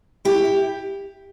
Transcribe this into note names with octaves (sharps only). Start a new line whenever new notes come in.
E4 G4
E4